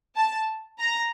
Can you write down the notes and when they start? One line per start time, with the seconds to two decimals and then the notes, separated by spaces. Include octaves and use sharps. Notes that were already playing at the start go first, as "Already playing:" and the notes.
0.16 A5
0.79 A#5